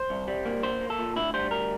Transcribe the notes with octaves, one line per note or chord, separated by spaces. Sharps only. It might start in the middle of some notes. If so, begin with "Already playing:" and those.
Already playing: C5
C2
G3
A#3
A#2 C5
A#3
A4
A#2
D2 E4
G3 C5
D2 A#4